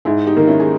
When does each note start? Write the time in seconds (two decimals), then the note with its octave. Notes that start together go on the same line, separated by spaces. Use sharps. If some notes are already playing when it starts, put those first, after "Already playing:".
0.05 G#2 E4 G#4
0.27 D#4 G4
0.37 D#3 A#3
0.47 C#4 E4
0.60 G#4